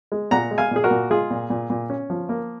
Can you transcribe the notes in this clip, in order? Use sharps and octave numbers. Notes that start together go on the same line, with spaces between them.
G#3
A#2 F#5 A#5
G#3
F5 G#5
A#2 G#4
F#4 A#4
A#2
G#3 F4 G#4
A#2
A#2
A#2
C#4
F3
A#3